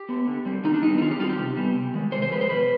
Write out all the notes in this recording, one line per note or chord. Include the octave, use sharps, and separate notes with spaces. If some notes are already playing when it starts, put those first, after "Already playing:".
Already playing: G4
B3
D3
G3 C4
D#3 D#4
D4
G3 B3 D#4
D#4
D#3 F4
G4
G3 C4 F4
G4
C3
G3 B3
C3
D#3 G#3
C3 C5
C5
F3 G#3 B4
C5
B2 B4